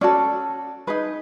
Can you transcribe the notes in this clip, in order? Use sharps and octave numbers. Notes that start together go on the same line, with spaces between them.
C#4 F#4 A4 D5
D#4 G#4 B4